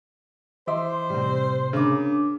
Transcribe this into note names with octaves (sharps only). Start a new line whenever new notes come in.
E3 C5 D#5 E5 C6 D6
A2 C3 G3 C4
C#3 A#3 D4 D6